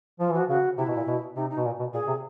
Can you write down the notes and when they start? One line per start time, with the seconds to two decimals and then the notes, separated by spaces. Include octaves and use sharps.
0.20 F3 F4
0.29 E3 F#4
0.39 F3
0.49 C#3 F#4
0.77 C3 E4
0.88 B2
0.96 A#2
1.07 B2
1.36 C3 D#4
1.50 D#4
1.57 B2
1.65 A#2
1.79 B2
1.93 A#2 G#4
2.07 C3